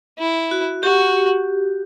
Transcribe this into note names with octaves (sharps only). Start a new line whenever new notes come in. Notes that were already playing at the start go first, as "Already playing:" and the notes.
E4
F#4
F#4 G4